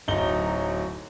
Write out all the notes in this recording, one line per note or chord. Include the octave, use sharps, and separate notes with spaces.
D1 F#3 D#4 G7